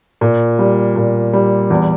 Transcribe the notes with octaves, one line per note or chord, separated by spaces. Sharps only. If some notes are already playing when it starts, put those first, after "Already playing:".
A#2
G3
A#2
G3
E2